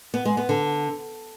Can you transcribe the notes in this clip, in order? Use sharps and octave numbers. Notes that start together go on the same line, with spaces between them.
B3
G#3
B3
D3